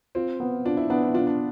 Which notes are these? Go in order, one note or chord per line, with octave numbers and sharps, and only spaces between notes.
C4 F4
B3
D4 F4
E4
B3 D4
E4
D4 F4
D4